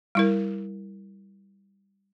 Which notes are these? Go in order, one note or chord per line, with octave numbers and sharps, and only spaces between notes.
G3 E4 A#4